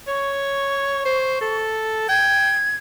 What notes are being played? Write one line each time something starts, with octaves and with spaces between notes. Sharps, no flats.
C#5 C#6
C5
A4
G5 G#6